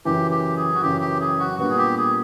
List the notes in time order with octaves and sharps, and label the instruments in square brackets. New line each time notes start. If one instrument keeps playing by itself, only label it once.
[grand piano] F#2 C#3 E3 [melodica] G4
[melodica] G4
G#4
F#4
[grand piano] F#2 C#3 E3 [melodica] G4
[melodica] G4
G#4
F#4
[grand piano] A#2 G3 B3 D4 [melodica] F#4
[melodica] G#4
G4
G#4